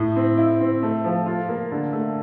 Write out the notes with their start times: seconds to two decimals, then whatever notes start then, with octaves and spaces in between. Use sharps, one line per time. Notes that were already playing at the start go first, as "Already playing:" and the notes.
Already playing: A2
0.16 C4
0.38 E4
0.60 C4
0.82 A3
1.04 F3
1.26 F4
1.49 A#3
1.71 D3
1.93 A3